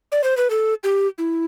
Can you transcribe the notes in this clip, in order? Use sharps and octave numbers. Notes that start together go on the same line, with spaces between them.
D5
C5
B4
A4
G4
E4